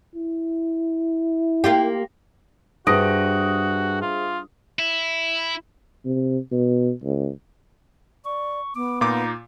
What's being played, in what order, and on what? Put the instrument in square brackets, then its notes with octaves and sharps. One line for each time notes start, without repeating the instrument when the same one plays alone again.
[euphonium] E4
[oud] A#3 F4 G4
[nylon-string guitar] G2 [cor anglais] F#4 [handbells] G#4 C5 E5 [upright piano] D#6 A#6 D7
[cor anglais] F4
[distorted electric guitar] E4
[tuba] C3
B2
C#2
[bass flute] D5 [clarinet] C#6
[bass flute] B3 [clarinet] D6
[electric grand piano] A#2 F4 D6 [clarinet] D#4